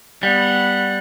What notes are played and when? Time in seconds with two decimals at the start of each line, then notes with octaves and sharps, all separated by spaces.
0.23 G3 B3 F#5